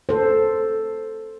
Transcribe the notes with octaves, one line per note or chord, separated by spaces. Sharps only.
A4 C5